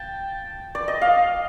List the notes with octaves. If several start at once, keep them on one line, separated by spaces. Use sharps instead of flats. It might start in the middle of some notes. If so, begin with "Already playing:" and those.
Already playing: G5 A5
D5
D#5
F5